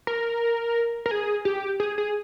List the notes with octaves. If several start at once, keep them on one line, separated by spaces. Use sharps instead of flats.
A#4
A#4
G#4
G4
G#4
G#4